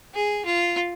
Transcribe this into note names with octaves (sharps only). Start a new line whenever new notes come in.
G#4
F4